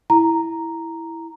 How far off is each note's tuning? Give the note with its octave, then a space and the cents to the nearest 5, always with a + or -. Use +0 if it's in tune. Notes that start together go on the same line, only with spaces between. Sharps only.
E4 +0 A#5 +0